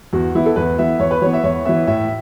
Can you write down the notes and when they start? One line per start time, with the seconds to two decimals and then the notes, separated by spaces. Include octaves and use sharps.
0.13 E2 F#4
0.35 E3 B3 E4
0.46 A4
0.56 E2 B4
0.78 E3 B3 E5
1.00 E2 C#5
1.11 B4
1.22 E3 B3 C#5
1.33 E5
1.44 E2 C#5
1.65 E3 B3 E5
1.87 A2 E5